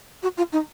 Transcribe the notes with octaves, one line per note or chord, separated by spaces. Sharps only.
F#4
F4
D#4